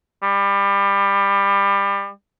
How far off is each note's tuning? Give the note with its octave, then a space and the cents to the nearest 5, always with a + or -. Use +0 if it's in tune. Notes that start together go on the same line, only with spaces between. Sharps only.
G3 +25